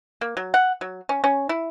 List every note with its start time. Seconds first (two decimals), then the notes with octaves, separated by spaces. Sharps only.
0.21 A#3
0.37 F#3
0.54 F#5
0.81 F#3
1.09 C#4
1.24 C#4
1.49 E4